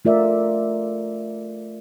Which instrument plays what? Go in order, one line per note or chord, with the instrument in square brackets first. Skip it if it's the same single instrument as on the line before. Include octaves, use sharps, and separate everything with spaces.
[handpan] A3 F4 A#4 D5 E5